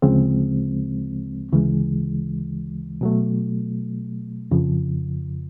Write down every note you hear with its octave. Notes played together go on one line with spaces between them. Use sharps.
D2 C#3 F3 G#3 C4
D2 C#3 E3 G#3
B2 F#3 A3
F2 C#3 F3